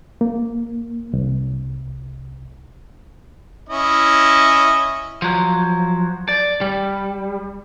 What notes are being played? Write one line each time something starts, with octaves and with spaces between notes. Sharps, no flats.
A#3
C2
C#4 E4 D#5
F3 F#3
D5
G3